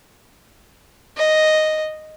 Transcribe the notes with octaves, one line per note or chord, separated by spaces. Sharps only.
D#5